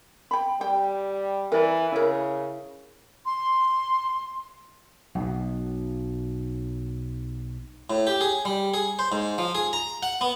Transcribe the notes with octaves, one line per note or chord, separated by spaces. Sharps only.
G5 B5
G3 G5
E3 A#4 D5
C#3 E4 A#4
C6
B1 B2
A2
G4
G#4
G3
G#4
C5
G#2
F3
G#4
A#5
F#5
B3